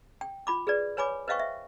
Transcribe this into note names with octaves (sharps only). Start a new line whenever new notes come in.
G5
F4 B5 D6
G#4 B4 D5
B4 C#5 G#5 B5 D6
B4 C5 D#5 F5 G5 C#6
E5